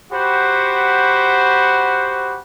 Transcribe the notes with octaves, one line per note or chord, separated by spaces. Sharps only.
F#4 G4 C5 F#5 B5